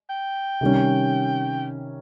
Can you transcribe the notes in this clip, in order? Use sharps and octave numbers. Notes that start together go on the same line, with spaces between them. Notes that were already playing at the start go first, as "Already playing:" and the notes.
G5
C3 D#3 G3 C#4